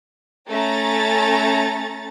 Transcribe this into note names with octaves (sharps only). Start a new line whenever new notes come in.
A3 C#4 A#5 A6